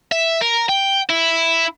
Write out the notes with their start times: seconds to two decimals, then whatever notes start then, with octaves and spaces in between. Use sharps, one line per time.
0.12 E5
0.41 A#4
0.69 G5
1.09 E4